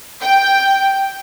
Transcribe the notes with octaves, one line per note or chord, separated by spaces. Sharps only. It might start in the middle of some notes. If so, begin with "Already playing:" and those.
G5